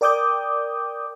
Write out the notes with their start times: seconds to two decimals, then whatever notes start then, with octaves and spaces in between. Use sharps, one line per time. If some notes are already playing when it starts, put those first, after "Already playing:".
0.01 A#4 D5 G5 D6 D#6 G6